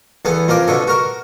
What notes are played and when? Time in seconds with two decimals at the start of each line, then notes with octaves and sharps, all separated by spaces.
0.25 E2 B3 A4
0.48 F2 F3 A#4 D6
0.68 B2 D3 A4
0.88 F#4 A#4